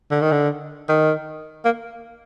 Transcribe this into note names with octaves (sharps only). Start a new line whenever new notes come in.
D3
D#3
D3
D#3
A#3